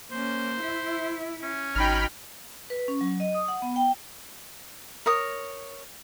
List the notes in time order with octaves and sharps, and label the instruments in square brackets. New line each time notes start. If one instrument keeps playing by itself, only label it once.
[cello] A#3 C#4 [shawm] C5
[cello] E4 E5
[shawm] C#4
[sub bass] G#1 [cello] D#4 F#4 [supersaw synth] G5 B5 F6
[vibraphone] B4
C#4
F#3
D#5
D#6
F#5
B3
G5
[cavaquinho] A#4 C#5 D#6